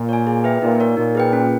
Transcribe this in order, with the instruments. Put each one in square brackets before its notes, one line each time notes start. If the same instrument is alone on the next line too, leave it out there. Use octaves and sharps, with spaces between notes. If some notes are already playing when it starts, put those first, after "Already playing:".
Already playing: [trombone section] A#2
[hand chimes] C#5 G#5
G#4
B4 E5 G5
[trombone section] A#2 [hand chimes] D#4
[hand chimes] A#4 C#5
[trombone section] A#2 [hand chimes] D#4
[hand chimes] G#4 B4 G5
C#4